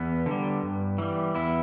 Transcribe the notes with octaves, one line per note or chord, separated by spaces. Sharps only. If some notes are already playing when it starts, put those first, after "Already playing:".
Already playing: E2 B3
D3 G3
G2
E3 G3
E2 B3 E4